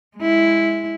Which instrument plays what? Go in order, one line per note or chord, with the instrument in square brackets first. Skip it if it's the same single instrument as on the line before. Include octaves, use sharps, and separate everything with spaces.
[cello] G#3 E4